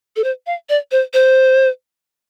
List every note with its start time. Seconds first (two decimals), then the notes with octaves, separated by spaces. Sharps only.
0.16 A4
0.24 C5
0.46 F5
0.69 D5
0.91 C5
1.14 C5